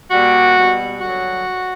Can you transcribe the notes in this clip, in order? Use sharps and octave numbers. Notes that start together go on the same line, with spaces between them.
A#2 G3 F#4
B2 G3
G2 D3 F#3 F#4